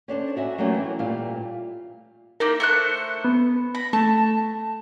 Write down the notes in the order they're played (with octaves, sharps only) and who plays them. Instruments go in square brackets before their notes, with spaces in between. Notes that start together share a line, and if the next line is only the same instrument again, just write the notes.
[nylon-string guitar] C#4 D4 A4 C5
D#4 F#4 E5 G#5
F#3 G3 A3 A#3 C#4 D4
E3
A#2 G3 A3 F5
[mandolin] A#3 D#4 E4 [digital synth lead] A#4
[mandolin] A3 C5 F#6 [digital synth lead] C#7
[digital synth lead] B3
[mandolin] B5 [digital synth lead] A#6
[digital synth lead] A3 [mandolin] A5